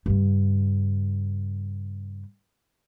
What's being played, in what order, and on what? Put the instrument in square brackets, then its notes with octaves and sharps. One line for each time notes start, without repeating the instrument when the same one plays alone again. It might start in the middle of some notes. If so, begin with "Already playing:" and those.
[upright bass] G2 C#3